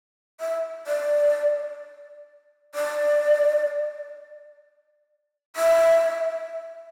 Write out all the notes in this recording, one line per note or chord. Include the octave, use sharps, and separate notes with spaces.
E5
D5
D5
E5